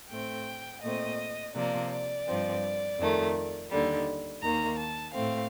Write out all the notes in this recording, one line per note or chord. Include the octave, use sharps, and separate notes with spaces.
A2 A3 C4 G5
A#2 A3 C4 D#5
C3 F3 A#3 D5
D5
G2 F3 C4
F2 D#3 A3
D#2 D3 G3
D#2 D#3 A#3 A#5
A5
A2 A3 C4 F5